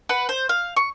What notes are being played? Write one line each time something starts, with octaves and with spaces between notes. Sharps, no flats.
B4 F#5
C5
F5
C#6